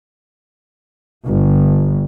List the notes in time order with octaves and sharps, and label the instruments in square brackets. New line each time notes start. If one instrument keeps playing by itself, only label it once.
[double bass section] G1